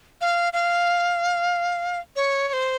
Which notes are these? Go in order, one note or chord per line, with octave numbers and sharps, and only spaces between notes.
F5
F5
C#5
C#5
C5